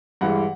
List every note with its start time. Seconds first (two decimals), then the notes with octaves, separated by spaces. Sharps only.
0.21 G2 E3 G#3 F#5